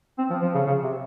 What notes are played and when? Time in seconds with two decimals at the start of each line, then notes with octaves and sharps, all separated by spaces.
0.18 C4
0.30 F3
0.42 F3
0.54 C#3
0.66 C#3
0.83 C3